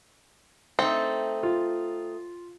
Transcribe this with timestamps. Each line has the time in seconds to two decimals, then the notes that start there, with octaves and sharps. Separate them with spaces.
0.79 A3 C4 D#4
1.43 F4